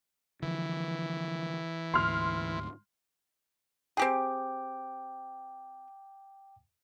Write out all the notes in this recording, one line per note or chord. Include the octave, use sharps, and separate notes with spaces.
D3 E3 F3
D2 G#2 C6 F6
C4 G4 G#4 G5 D6